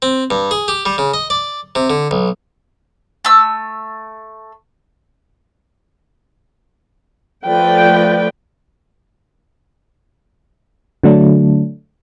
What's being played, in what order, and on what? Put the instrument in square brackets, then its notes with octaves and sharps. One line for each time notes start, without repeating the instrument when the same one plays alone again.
[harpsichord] C4
G2
G#4
G4
G3
C#3
D#5
D5
C3
D3
B1
[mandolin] A3 E6
[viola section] F3 A3 B4 D5 G5
[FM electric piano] D3 F#3 A3 D4